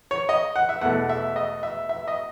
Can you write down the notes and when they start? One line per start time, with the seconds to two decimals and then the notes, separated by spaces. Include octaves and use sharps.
0.11 C#5
0.29 D#5
0.56 F#5
0.69 E5
0.81 E2 B2 A3 F#5
1.09 E5
1.36 D#5
1.63 E5
1.89 E5
2.08 D#5